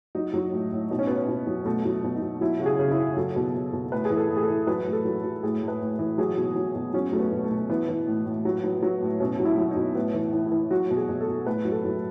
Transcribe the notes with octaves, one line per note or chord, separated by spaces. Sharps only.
F#3 D#4
F#3
A2
A2
B2 D#4
C#4
B2 B3
C#4
B2
F#3
B2 A3
F#3
B2
D#4
B2
F#3 E4
C#3 F#4
G#4
C#3
E4
C#3
F#3 A4
B2
B2
B2
A2 B4
G#4
E3
A4
A2
G#4
A4
E3
F#3 B4
A2
A4
F#3
F#3
A2 G#4
A2
B4
A2
E3
F#3 G#4
B2
F#3
B2
F#3 C#4
F#3 A3
B3
B2
A3
B2
E3 B3
E3
A2
A2
F#3
F#3
F#3
A2
B2 C#4
F#3
E4
F#3
D#4
B2
A2 B3
E3
E3
E4
E3
F#3 F#4
B2
G#4
B2
A4
B2
A2 B4
F#3
A4
F#3